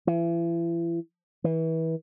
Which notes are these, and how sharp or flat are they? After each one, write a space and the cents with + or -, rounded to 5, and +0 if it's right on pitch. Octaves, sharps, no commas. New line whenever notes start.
E3 +35
E3 -25